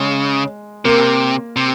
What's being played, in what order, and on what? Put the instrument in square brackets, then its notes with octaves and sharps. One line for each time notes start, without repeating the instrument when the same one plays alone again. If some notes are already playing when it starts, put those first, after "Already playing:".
Already playing: [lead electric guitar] C#3 [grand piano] G#3
[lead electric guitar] C3 [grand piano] A#3
[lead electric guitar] C3